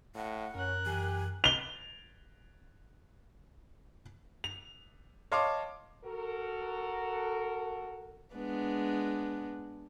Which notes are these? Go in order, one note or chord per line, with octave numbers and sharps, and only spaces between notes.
A2 F#5
F#2 C#4 A#4 F#6
F#2 E3 G4 G#5
F7 G7
F7
C#5 D#5 F5 A5 C6 D6
F#4 A4 A#4
G#3 B3 D4